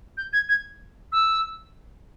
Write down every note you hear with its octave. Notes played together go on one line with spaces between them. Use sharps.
G6
G#6
G#6
E6